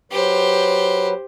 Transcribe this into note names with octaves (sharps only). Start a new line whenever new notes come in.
F#3 G4 B4 C5